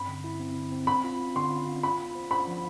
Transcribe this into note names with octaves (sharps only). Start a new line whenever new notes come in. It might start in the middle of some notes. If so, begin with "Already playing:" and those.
Already playing: G2 C4 B5
D3
E4
C4
D3
C4
C4 B5
F4
F4
D3 C6
F4
F4
F4 B5
B3
C5
C5 B5
F3